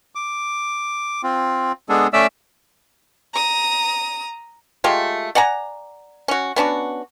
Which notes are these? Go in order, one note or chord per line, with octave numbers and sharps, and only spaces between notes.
D6
C4 F4
G#3 B3 D4 G#4 A4
A3 C#4 D5 E5 E6
A#5 D#6
G#3 A3 F4 G4
D5 F#5 G#5 A#5
C#4 F#4
B3 C#4 D4 F#4